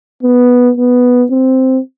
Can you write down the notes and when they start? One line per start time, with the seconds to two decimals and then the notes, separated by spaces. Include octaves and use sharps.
0.23 B3
0.77 B3
1.31 C4